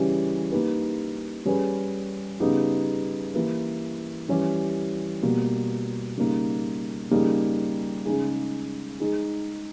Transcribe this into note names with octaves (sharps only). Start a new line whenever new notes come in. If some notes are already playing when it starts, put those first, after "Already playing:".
Already playing: C#3 E3 G3 C#4 G4
A#3 D#4 G4 B4
G3 C#4 G#4 B4
C#3 G3 B3 D#4 G4
E3 A#3 E4 G4 B4
E3 G3 C#4 G4
B2 G3 A#3
C#3 G3 A#3 D#4
C#3 G3 A#3 D#4 G#4
C#3 G#3 D#4 G#4
G#3 D#4 G#4